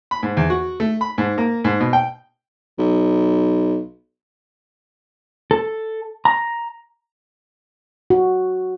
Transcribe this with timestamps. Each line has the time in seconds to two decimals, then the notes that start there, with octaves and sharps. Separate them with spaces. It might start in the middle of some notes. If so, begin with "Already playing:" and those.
0.11 B5
0.23 G#2
0.37 E2
0.50 F#4
0.80 A3
1.01 B5
1.18 G#2
1.38 A#3
1.64 G#2
1.80 B2
1.93 G5
2.79 B1
5.51 A4
6.25 A#5
8.10 F#4